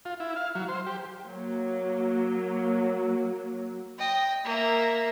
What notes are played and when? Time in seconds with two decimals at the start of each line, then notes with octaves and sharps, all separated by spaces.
0.05 F4
0.20 E4
0.36 F5
0.55 F#3
0.68 C5
0.87 G4
1.26 F#3 A#3
3.99 D#5 G5
4.45 A#3 E5